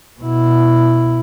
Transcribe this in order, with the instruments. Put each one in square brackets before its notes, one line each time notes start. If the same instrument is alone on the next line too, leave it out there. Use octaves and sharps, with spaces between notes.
[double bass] B2 E4